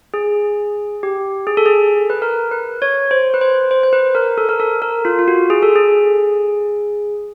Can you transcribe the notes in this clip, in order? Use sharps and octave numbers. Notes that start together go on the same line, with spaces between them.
G#4
G4
G#4
A4
G#4
B4
A#4
B4
C#5
C5
B4
C5
C5
C5
B4
A#4
A4
A#4
A4
A#4
F4
F4
F#4
G#4
A4
G#4